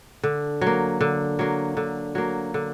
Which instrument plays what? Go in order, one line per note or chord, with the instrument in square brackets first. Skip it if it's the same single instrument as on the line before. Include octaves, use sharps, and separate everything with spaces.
[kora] D3
F#3
A#3
D3
F#3 A#3
D3
F#3 A#3
D3